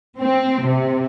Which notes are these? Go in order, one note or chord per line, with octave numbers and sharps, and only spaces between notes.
C4
C3